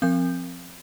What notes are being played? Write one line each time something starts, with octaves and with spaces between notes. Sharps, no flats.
F3 C4 G6